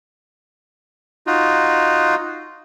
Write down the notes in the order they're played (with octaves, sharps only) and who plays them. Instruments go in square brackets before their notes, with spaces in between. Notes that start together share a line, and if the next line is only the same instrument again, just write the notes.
[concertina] D#4 F4 F#4